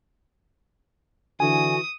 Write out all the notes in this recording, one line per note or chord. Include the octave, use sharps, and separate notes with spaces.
D3 E3 F#4 G#5 D#6